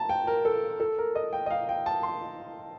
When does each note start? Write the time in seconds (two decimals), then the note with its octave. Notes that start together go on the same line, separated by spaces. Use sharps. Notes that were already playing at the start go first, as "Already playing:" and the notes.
Already playing: A5 A#5
0.09 G5
0.27 A#4
0.45 A4
0.80 A4
0.98 A#4
1.15 D#5
1.33 G5
1.46 D#5
1.50 F5
1.69 G5
1.86 A5
2.03 C6